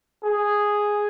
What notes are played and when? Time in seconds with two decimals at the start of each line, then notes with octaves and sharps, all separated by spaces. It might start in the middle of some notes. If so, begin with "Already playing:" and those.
0.24 G#4